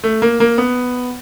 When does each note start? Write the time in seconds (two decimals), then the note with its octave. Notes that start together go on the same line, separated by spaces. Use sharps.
0.04 A3
0.22 A#3
0.40 A#3
0.58 B3